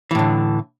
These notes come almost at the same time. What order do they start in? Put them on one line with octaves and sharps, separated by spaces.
E3 A2 D3